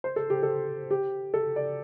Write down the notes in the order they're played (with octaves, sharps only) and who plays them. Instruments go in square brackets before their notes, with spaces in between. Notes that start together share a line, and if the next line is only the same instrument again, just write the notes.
[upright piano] C5
A4
G4
A4
G4
A4
D5